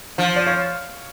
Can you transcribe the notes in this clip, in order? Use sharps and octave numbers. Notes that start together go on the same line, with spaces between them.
F3
D5
C#5 F5